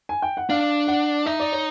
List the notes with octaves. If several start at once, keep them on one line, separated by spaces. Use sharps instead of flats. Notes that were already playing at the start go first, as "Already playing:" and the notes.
G#5
G5
F#5
D4 F5
F#5
D#4 E5
D5
C#5